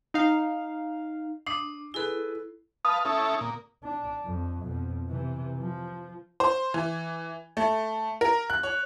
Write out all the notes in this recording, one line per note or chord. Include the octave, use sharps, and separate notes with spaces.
D#4 F5
D4 D6 D#6 C7
E4 G#4 A4 B4
B4 F5 A5 D#6
C#4 E4 A4
A#2
D4
F2
F2 B2
C3 E3
F3
C5
E3
A3
A#4
F#6
C#5